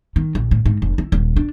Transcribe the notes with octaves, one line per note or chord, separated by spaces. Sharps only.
D#3
A#1
A2
G#2
F1
E4
D#1
D4